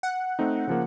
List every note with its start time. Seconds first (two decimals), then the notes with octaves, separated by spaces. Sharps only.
0.03 F#5
0.39 A3 C4 D#4
0.67 C#3 F3 A#3